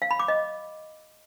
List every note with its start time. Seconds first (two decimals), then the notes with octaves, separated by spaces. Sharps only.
0.02 F5
0.11 B5
0.19 D6
0.28 D#5